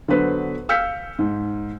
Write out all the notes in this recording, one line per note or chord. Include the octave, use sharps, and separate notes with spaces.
D3 F#3 B3 B4 C5
F5 E6 F6 G6 B6 C#7
G#2